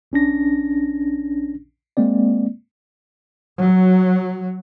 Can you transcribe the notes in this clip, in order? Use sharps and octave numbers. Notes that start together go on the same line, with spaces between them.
A#1 C#4 D4 A#6
G#3 A#3 C4 D5
F#3